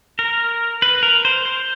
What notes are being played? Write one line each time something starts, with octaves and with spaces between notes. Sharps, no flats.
A#4
B4
A#4
C5
C5